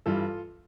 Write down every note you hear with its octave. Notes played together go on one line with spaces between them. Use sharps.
G2 E3 G3 F4 A4